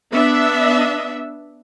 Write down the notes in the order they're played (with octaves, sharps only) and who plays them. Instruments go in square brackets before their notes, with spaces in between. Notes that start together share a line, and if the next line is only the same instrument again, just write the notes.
[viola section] B3 D4 E5